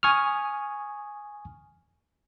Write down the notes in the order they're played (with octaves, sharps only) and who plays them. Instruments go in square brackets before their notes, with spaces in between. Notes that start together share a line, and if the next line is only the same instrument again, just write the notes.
[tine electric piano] G#5 C#6 D#6 F6